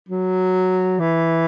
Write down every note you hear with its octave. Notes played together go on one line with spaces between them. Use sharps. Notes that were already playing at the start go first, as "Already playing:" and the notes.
F#3
E3